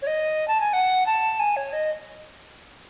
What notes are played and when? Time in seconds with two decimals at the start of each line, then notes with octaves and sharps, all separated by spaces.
0.02 C#5
0.07 D#5
0.48 A5
0.60 G#5
0.73 F#5
1.06 A5
1.40 G#5
1.56 C#5
1.73 D#5